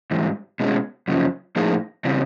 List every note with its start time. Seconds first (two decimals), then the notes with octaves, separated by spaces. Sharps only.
0.11 G#2 E3 G3
0.60 B2 G#3 C#4
1.08 F#2 C#3 F3
1.56 A2 F3 A#3 D#4 G#4
2.05 C#3 E3 G3 C4